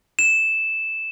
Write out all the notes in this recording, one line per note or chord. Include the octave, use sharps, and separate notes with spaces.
E7